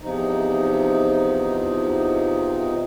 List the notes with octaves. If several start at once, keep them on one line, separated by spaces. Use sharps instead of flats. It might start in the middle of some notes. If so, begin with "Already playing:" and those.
E2 C3 F3 D#4